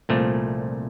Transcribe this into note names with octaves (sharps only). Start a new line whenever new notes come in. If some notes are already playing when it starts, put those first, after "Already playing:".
C2 A#2 F3 A3